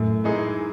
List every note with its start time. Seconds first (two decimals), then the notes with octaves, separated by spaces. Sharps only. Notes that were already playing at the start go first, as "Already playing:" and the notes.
Already playing: F#2 A2 A3
0.24 E3 G#3 D#4 G#4